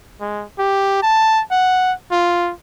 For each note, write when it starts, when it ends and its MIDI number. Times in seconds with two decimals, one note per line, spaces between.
0.21 0.44 56
0.59 1.00 67
1.03 1.42 81
1.51 1.93 78
2.12 2.52 65